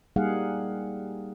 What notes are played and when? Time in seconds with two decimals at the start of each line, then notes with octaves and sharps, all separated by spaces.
0.16 G3 A#3 D#4 G#4 F5 F#5